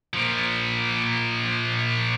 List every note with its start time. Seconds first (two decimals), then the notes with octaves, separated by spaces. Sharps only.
0.14 A#2 F3